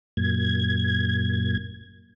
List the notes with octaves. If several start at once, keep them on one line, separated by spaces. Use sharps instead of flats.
F#2 A#2 G#6